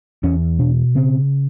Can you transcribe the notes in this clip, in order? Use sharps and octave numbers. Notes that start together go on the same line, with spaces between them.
E2 C#4
B2 D4
C#3 C4